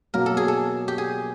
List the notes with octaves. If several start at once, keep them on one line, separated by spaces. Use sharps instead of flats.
B2 F#3 A#3 A#4
A4
G#4
A4
G4
G#4